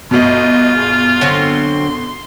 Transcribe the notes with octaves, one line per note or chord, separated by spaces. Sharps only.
G1 B2 F4 D#5
G#4
D3 F#3 C4 C6